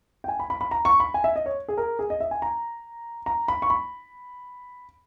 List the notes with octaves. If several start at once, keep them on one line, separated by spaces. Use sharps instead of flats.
G5
G#5
B5
B5
B5
A#5
C#6
B5
G#5
E5
D#5
C#5
G#4
A#4
G#4
D#5
E5
G#5
A#5
A#5
B5
C#6
B5